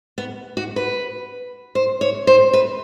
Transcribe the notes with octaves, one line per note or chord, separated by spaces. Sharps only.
B3
F#4
B4
C5
C#5
C5
B4